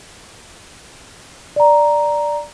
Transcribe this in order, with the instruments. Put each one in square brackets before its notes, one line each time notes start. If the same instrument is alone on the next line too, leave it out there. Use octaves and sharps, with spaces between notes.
[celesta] D5 A#5